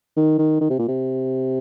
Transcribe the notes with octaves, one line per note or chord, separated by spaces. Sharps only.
D#3
D#3
D#3
C3
A#2
C3